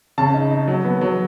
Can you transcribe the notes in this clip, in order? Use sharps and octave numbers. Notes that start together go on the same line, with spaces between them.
C#3 A5
D#4
D#4
F#3
B3
F#3